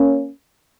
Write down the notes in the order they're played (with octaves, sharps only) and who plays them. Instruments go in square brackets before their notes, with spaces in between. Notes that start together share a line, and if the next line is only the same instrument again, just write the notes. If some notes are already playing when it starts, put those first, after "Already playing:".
Already playing: [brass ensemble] A#3 C#4